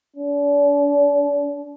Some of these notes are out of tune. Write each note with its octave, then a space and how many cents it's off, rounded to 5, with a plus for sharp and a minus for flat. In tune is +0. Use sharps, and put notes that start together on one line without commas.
D4 -40